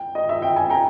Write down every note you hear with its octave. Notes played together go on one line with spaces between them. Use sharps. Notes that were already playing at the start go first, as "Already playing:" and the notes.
Already playing: G5
D#5
E5
G5
G#5
G5 A#5